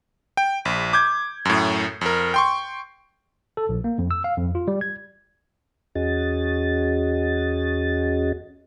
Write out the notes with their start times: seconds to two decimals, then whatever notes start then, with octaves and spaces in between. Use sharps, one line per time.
0.37 G5
0.65 A#1
0.93 D6 G6 G#6
1.45 F#2 A2
2.01 F2 A#4
2.34 G5 C6 C#6
3.57 A4
3.69 A#1
3.84 A#3
3.99 F2
4.11 E6
4.24 F5
4.38 F2
4.55 F4
4.68 G3
4.81 G#6
5.95 E2 C#4 F#4 G#4 D#5 A6